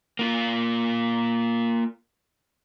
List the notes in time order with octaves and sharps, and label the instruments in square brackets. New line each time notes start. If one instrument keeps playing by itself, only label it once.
[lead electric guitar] A#3 F4